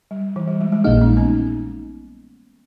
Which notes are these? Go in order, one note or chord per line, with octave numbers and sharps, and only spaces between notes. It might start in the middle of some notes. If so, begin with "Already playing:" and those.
G3
E3
G3
G#3
G#3
A#1 A#2 G#3 A#3 D#4
C#4
B3